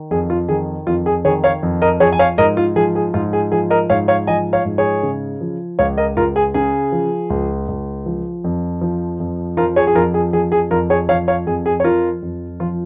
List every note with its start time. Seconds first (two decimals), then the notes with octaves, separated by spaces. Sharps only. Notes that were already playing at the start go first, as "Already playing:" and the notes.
Already playing: D#3
0.11 F2 G#4
0.30 F4
0.49 D#3 G#4
0.87 F2 F4
1.06 G#4
1.25 D#3 G#4 C#5
1.44 C#5 F5
1.63 F2
1.82 A#4 D#5
2.00 F3 G#4 C#5
2.13 G#5
2.19 C#5 F5
2.38 G#2 A#4 D#5
2.57 F4
2.76 F3 G#4
2.95 G#4
3.14 G#2 F4
3.33 G#4
3.52 F3 G#4
3.70 A#4 D#5
3.90 G#2 C#5 F5
4.08 C#5 F5
4.27 F3 D#5 G#5
4.53 C#5 F5
4.65 G#2
4.78 G#4 C#5
5.03 C#3
5.41 F3
5.79 C#2 C#5 F5
5.98 A#4 D#5
6.17 C#2 F4 A#4
6.36 G#4
6.54 C#3 G#4
6.92 F3
7.30 C#2
7.68 C#2
8.06 F3
8.44 F2
8.81 F3
9.20 F2
9.57 F3 F4 A#4
9.76 G#4 C#5
9.87 G#4
9.95 F2 F4 A#4
10.14 G#4
10.33 F3 G#4
10.52 G#4
10.71 F2 F4 A#4
10.90 G#4 C#5
11.09 F3 C#5 F5
11.28 C#5 F5
11.47 F2 G#4
11.66 G#4
11.80 C#5
11.84 F3 F4 A#4
12.22 F2
12.60 F3 F4